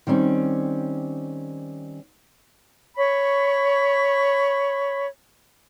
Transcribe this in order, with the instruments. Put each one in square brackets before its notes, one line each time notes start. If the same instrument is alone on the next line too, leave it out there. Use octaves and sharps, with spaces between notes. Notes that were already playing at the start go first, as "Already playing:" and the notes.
[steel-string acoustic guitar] D#3 G3 C4 C#4
[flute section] C#5 B5 C#6